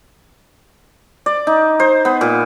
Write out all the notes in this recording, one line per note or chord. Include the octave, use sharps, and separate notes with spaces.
D5
D#4
C5
B3
A#2